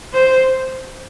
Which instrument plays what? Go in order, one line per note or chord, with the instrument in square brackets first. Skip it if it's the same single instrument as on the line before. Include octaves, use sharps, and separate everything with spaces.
[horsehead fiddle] C5